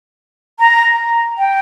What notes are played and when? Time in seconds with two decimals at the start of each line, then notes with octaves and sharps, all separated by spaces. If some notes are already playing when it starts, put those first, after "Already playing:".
0.59 A#5
1.38 G5